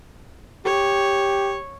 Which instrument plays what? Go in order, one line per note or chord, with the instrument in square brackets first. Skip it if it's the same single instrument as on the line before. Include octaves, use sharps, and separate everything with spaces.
[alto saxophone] G4 [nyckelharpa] C#5